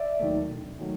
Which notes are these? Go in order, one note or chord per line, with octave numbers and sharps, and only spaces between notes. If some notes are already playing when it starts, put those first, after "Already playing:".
Already playing: D5 E5
D#2 D#3 F#3 A3
E1
D#3 F#3 A3